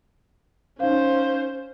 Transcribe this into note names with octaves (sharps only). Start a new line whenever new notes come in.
C#4 D#4 C5 F5